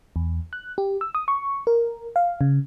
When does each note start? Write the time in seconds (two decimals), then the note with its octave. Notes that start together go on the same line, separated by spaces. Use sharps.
0.16 E2
0.53 F#6
0.78 G4
1.01 E6
1.15 D#6
1.28 C#6
1.67 A#4
2.16 F5
2.41 C#3